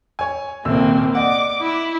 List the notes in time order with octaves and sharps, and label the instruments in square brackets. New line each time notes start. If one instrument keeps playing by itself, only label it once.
[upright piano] C#5 G#5
[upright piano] D#1 C2 E6 [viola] A#3 C4
[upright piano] D5 D#5 F#5 [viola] D6
[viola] E4